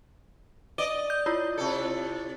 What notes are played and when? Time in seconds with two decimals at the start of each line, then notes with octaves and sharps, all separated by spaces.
0.78 D5 D#5 D#7 G7
1.10 G6
1.26 E4 F4 C#5
1.58 C3 A4